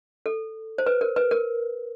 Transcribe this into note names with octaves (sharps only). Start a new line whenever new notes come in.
A4
C5
B4
A#4
B4
A#4